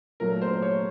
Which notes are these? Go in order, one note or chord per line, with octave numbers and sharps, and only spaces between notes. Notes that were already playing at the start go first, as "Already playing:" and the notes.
A#2 F#3 A3 A#4
C5
C#5